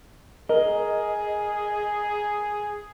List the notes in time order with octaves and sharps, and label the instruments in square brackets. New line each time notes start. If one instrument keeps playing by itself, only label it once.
[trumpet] G#4 [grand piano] A#4 [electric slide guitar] D#5